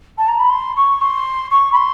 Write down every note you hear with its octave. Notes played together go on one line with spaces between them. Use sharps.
A5
A#5
B5
C6
C#6
C6
C#6
B5
C6